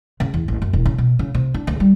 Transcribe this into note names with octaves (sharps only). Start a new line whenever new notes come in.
C#3
E2
A1
F#2
E1
C#3
B2
C#3
C3
D4
D2
G3